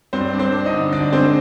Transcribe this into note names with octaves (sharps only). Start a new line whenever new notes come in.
G2 C4 C5
D4
C4 C5
D4
D#4 D#5
D3
D3 D4 D5
G#3 C4 C5